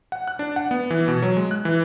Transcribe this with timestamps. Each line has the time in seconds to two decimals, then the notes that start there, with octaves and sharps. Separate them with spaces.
0.12 F#5
0.28 F#6
0.39 D4
0.56 F#5
0.71 B3
0.90 E3
1.08 B2
1.22 F#3
1.37 G#3
1.51 F#6
1.65 E3